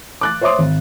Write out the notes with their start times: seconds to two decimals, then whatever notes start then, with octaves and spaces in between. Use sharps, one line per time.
0.21 D6 F#6 A6
0.41 C5 C#5 E5 C6 D6 D#6
0.59 G#1